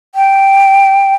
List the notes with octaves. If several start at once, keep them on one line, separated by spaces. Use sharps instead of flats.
G5